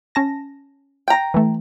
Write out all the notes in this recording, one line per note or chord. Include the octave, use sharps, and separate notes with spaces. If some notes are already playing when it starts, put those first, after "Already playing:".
C#4 A5 A#6
G5 A#5
E3 A3